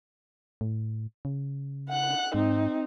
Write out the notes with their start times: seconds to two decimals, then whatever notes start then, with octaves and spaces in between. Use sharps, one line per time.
0.61 A2
1.25 C#3
1.89 F#5 F#6
2.34 G#2 C4 D#4